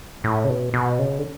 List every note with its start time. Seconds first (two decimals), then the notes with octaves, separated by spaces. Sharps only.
0.24 A2
0.45 C#3
0.49 B2
0.74 B2
0.99 C#3
1.19 D3